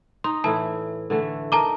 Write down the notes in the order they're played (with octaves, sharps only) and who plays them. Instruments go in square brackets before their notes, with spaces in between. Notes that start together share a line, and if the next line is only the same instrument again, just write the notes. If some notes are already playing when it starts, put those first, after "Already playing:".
[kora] D#4 [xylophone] C6
[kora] A2 E3 E4 [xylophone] A5
[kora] D3 E3 A3
[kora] D#4 A#4 [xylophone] A5 A#5 D6